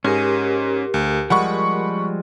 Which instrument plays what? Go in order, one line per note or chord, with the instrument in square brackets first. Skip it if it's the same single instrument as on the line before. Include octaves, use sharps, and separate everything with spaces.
[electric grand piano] G#2 [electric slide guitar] C#4 G#4 [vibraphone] G4 A#4
[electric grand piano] D2
[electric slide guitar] F3 G3 G#3 [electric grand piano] F#5 B5 C#6